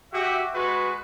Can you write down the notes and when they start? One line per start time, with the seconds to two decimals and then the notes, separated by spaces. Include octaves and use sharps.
0.12 F#4 G4 E5
0.54 G#3 F#4 B4